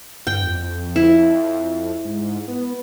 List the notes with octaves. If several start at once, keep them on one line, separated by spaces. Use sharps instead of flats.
G2 G5
F2
E4
G#2
B3